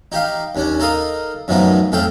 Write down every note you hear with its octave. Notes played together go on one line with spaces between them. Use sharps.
D#4 G4 F5
D#2 C#4 D4
D#4 A4 A#4 F5 D#6
F#2 A2 D#3 F3 B3 D#4
F2 A2 A4 F5 G5